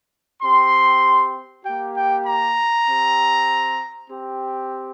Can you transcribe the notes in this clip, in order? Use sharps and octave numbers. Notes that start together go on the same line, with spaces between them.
C4 G4 C6
A#3 G4 G5
G5
A#5
C4 G4
C4 G4